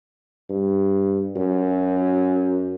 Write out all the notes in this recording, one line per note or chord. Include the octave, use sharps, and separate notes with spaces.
G2
F#2